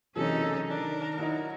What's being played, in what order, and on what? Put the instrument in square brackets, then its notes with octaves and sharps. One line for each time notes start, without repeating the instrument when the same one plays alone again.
[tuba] F#1 [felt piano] C3 E3 F#3 [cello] C#4 D#4 [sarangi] A4
[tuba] D#3 [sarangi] D4 [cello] A#4
[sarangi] F#3 [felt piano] D#4 E4 D#5